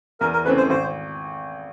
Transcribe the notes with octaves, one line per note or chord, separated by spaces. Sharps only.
E2 A#4
A#4
C#3 E3 A3 C4 B4
C5
G#1 C5